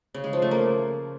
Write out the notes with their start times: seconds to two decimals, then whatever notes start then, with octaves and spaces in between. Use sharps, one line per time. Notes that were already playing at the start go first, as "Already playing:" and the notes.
0.14 C#3
0.24 G#3
0.33 F3
0.42 A3
0.51 A#3